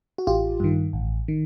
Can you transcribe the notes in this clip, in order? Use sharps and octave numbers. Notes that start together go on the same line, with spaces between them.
F#4
A1 F4 G4
G2 D#3
A1
D#3